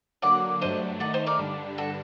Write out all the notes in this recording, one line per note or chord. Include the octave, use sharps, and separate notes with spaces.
D3 F#3 A#3 D5 F#5
G2 F#3 A3 D4 C5 D#5
D#3 A3 D#4 D5 F#5
C5 D#5
A#4 D5
G2 D3 G3 D4
F#4 A4